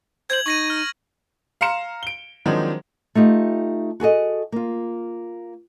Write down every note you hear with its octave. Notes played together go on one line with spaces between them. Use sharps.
C5 G#6 F#7
D#4 C#6 A#6 D#7
F6
F5 A#5 C6 C#7 E7
D7 G7
D#3 F3 F#3 G#3 C4 D4
A3 D#4 F4 G4
F#4 G#4 A4 D#5
A#3 F4